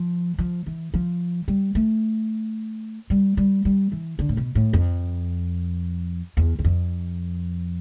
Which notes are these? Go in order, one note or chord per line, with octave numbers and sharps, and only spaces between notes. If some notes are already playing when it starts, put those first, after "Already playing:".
Already playing: F3
F3
E3
F3
G3
A3
G3
G3
G3
E3
D3
A2
B2
A2
F2
E2
E2
F2